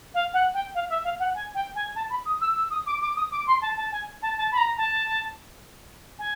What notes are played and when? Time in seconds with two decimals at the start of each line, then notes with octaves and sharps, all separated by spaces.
0.14 F5
0.33 F#5
0.54 G5
0.74 F5
0.89 E5
1.04 F5
1.19 F#5
1.34 G#5
1.54 G5
1.75 G#5
1.95 A5
2.10 B5
2.25 D#6
2.40 E6
2.55 E6
2.70 D#6
2.86 D6
3.01 D6
3.16 D#6
3.31 D6
3.47 C6
3.61 A5
3.76 A5
3.91 G#5
4.22 A5
4.37 A5
4.51 B5
4.57 A#5
4.77 A5
6.18 G#5